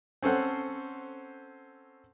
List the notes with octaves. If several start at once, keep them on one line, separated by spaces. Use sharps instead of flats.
C4 C#4 A4 C5 F#5